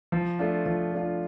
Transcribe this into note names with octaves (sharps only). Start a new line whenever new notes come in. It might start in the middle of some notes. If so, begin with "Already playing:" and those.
F3
A3 D4 F4
F3
A3 D4 F4